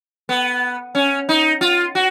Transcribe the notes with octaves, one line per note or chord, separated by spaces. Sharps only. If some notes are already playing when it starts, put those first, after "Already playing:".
B3
C#4
D#4
F4
F#4